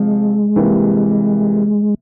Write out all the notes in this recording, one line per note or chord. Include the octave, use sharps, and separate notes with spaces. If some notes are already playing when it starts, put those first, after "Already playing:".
Already playing: C3 F3 G#3 C4
C3 E3 G3 A#3